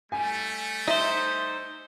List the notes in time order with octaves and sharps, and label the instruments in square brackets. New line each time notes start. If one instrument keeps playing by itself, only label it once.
[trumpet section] G3 A3 [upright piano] G#5
[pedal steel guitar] D#4 C5 [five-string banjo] D#5 E5